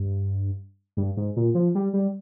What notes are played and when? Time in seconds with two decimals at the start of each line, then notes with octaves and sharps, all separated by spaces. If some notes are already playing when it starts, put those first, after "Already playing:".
Already playing: G2
0.97 G2
1.17 G#2
1.36 A#2
1.55 F3
1.75 G3
1.93 G3